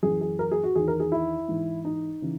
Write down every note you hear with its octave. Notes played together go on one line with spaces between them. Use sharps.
F#2 E3 G#4
G#4
A#4
G#4
F#4
E2 D#3 G#4
A#4
G#4
E4
G#2 E3
D#4
C#3 E3